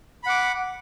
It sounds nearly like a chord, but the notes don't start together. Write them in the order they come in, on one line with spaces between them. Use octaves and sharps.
B5 F#5 D6